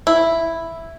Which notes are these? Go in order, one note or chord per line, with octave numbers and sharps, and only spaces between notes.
E4